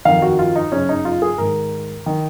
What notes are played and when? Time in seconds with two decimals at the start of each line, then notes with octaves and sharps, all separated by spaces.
0.05 F2 D#3 F5
0.22 F#4
0.39 F4
0.56 D#4
0.72 F#2 C#3 C#4
0.89 D#4
1.05 F4
1.22 G#4
1.38 G#2 D#3 A#4
2.06 D#3